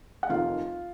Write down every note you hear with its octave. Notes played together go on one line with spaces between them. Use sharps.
F#5
F1 D#2 D#3 A#3 F4 F5